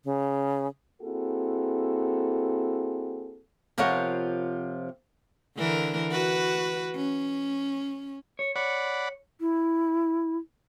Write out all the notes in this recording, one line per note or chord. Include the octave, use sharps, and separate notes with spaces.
C#3
A#3 C4 E4 F#4 G#4 A4
C3 F3 F4 A#4 C#5 F#5
D3 E3 A#4
F#4 B4
C#4
C#5
C#5 D5 F#5 B5
E4